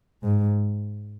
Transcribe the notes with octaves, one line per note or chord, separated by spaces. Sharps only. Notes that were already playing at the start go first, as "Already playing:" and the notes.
G#2